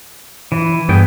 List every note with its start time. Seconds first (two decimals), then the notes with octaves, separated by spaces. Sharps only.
0.52 E3
0.89 G2 B3 G#4 G5